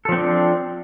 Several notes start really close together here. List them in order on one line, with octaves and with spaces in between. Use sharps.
A4 F3 C4 D4